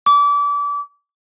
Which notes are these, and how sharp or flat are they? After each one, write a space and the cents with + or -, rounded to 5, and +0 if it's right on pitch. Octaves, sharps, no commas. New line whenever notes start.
D6 -30